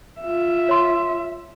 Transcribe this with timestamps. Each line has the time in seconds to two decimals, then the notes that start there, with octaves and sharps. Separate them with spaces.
0.21 F4 E5
0.69 C#5 C6